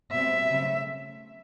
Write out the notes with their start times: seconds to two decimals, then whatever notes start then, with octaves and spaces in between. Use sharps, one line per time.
0.13 B2 G3 C4 E5
0.48 C#3 F#3 A3 C4